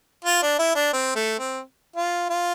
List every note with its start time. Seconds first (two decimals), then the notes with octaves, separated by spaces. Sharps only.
0.25 F4
0.42 D4
0.59 E4
0.75 D4
0.93 C4
1.15 A3
1.39 C4
1.96 F4
2.30 F4